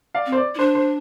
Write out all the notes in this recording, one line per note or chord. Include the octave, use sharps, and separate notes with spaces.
D5 F5
C4
C5
D5
E4
D4 C5
C5